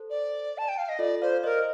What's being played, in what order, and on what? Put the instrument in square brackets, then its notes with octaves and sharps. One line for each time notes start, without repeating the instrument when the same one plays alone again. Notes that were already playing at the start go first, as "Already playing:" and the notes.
Already playing: [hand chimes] A4 C5
[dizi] D5
A5
G5
F5
D#5
[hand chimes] F4 A4 [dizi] D5
[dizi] C5 [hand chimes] D5 F5
[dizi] A#4 [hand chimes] C5 D#5